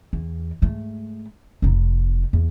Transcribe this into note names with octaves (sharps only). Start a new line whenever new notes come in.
E2
G#2 A3
F1 D#4
E2